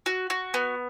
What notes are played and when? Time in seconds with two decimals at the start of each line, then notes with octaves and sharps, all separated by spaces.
0.06 F#4
0.30 F#4
0.54 B3